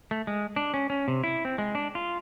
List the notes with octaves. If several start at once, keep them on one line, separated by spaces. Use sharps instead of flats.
A3
G#3
D4
C#4
C#4
C3
E4
C4
G#3
D4
F4